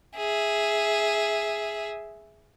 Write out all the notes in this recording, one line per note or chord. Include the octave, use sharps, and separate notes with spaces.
G#4 E5